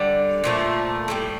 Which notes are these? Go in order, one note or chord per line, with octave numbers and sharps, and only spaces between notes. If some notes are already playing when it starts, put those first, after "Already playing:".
Already playing: D3 G3 D5
A#2 F3 A3
A2 E3 G3